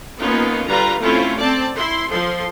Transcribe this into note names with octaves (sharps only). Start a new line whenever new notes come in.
A#3 B3 C#4 D#4 F4
D3 G3 F4 B4 A#5
A3 C4 C#4 E4 F4
C4 D5 A5
E4 C6
F3 A4 C6